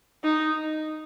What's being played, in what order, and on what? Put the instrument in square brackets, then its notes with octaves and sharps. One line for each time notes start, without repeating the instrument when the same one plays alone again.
[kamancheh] D#4